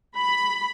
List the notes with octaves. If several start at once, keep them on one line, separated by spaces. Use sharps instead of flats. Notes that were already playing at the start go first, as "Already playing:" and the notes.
B5